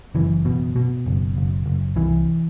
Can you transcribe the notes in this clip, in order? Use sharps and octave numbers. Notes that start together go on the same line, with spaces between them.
F#1 E3
B2
B2
F#1
F#1
F#1
C2 E3